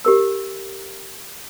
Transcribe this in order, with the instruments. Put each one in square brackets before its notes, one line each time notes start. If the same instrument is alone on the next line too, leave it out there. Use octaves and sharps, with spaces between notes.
[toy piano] G4 A#4 E6